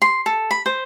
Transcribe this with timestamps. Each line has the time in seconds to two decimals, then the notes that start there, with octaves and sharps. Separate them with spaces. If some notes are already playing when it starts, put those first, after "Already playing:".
0.02 C6
0.26 A4
0.51 B5
0.66 C5